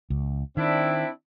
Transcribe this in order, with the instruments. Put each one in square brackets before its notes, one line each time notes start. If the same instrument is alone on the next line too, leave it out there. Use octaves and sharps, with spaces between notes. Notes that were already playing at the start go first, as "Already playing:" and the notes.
[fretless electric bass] C#2
[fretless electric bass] D#3 [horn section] C4 D4 E4